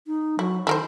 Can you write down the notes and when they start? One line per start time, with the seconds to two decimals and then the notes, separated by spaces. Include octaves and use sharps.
0.07 D#4
0.39 F#3 E4
0.67 D#3 E4 A#4 C5